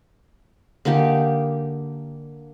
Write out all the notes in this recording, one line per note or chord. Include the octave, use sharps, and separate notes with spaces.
D3 A#3 D#4 G4